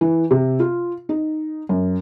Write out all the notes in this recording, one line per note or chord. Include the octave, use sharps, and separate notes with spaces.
E3
C3
F4
D#4
F#2